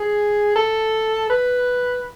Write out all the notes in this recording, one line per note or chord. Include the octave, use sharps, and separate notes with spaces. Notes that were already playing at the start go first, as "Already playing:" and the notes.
Already playing: G#4
A4
B4